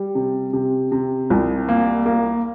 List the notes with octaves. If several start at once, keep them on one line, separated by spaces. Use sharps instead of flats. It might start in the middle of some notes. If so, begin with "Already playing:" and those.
Already playing: G3
C3
C3
C3
C2
A#3
A#3